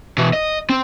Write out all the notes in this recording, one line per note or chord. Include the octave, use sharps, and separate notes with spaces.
B2 E3
D#5
C4